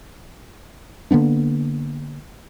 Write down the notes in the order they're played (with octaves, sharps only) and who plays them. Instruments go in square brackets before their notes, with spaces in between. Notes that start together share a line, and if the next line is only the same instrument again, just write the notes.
[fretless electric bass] D3 A#3 B3 D4